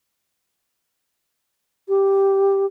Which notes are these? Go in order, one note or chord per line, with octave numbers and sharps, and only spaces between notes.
G4